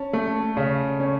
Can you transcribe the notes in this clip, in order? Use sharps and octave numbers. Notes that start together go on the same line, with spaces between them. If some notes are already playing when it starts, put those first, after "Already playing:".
Already playing: C#4 A5
A3
C#3
C#4